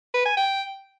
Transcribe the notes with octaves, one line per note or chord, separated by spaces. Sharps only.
B4
G#5
G5